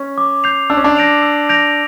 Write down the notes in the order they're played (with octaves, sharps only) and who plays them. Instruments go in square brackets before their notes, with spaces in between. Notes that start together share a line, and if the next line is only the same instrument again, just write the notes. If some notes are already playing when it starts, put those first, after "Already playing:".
Already playing: [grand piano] C#4
[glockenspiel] D6
G6 C7 F7
[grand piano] D4 [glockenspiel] E6
[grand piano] C#4
D4
[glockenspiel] G6 A#6 D7 F7
E6
G6 A#6 D7 F7